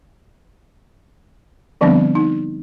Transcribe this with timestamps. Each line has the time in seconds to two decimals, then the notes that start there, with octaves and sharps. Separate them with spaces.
1.81 D3 F3 G3 B3 C4 D4
2.15 D#4